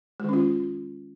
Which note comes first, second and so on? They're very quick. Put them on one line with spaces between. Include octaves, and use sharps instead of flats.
G#3 D#3 C#4 F4